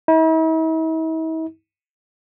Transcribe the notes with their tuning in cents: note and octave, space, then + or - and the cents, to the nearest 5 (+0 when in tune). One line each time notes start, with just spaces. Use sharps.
E4 -45